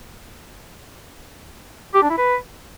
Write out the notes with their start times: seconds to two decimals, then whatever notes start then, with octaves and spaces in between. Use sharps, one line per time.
1.94 G4
2.02 D4
2.10 E4
2.18 B4